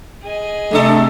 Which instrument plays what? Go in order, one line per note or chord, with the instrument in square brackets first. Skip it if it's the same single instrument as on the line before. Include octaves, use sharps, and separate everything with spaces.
[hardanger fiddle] G#4 D#5
[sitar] G2 D4 A4 [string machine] C3 [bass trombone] A3